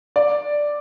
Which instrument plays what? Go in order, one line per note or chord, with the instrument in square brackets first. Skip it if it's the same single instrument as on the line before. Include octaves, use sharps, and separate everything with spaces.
[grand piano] D5